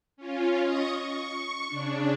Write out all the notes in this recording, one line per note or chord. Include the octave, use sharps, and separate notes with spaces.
C#4 F4
D#5 C#6 D#6
C#6
C#3 D4